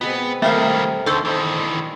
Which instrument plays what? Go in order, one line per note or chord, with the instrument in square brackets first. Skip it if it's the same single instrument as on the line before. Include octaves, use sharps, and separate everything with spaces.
[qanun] B2 G#3 C4 [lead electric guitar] B3
[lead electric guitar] D#3 G3 [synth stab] A3 A#4 F5 [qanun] C4 A4
[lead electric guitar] D2 [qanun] D4 D#4 D5 [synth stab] A4 C5
[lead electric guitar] D#3 E3 [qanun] C6